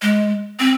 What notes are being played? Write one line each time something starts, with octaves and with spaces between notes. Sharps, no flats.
G#3
C4